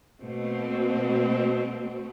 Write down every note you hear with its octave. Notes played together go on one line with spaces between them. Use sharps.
B2 A3 A#3 C4